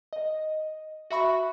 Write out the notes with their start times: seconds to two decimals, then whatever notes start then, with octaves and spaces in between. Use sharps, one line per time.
0.13 D#5
1.10 F#4 E5 B5 C#6